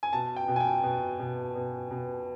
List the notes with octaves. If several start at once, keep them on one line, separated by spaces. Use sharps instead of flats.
G#5
B2 A5
G5
B2
G#5
G5
B2
B2
B2
B2